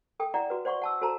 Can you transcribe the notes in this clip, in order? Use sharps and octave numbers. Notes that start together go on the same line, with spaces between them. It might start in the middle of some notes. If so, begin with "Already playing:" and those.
A4 G5 D#6
E4 D5 F#5 A#5
F#4 B4
C5 D5 F#5 C6 C#6
F#5 A5 E6
F#4 A4 C5 A5 A#5